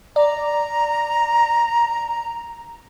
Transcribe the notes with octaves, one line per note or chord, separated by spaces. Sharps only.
D5 A#5